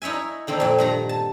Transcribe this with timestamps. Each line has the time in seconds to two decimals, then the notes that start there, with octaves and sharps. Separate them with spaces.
0.02 D#4 E4 C#5 E5 G#5
0.47 D3 D#3 A#3 C4
0.60 F2 A#2
0.78 G2 D#3 A#5
1.09 A5